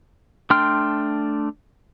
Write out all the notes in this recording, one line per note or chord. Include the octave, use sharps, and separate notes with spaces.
A3 D4 G5 C6 F6